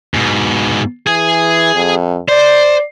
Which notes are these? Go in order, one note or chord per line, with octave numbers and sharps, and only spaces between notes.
G#2 B2
E3 G#4 G#5
F2
C5 D5